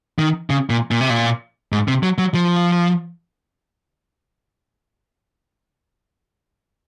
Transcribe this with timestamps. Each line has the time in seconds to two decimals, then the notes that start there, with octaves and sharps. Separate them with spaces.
0.19 D#3
0.50 C#3
0.70 A#2
0.91 A#2
1.01 C3
1.10 A#2
1.72 G#2
1.88 C3
2.03 F#3
2.18 F#3
2.34 F3